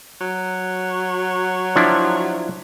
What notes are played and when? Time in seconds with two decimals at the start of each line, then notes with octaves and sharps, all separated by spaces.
0.21 F#3
1.76 F3 D4 E4